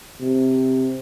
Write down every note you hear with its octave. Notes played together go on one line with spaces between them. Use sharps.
C3